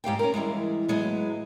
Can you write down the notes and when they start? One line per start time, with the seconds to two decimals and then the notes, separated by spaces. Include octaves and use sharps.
0.04 G#2 G4 F5 G5
0.19 C#4 A#4
0.34 E3 F3 G3 G#3
0.88 A2 F#3 G#3 B3